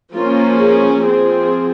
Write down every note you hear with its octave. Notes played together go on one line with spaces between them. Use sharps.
F3 A#3 C#4 F4
G#4
F3 C4 G#4